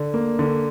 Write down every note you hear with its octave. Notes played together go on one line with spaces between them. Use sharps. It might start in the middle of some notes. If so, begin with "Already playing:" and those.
Already playing: D3
A#3
D3